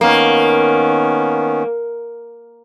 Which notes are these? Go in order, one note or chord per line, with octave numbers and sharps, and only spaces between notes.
D#3 A#3 B3 C#4